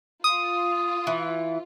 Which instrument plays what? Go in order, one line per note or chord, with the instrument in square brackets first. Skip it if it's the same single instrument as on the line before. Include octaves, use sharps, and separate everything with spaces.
[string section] F4 [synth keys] D#6
[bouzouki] E3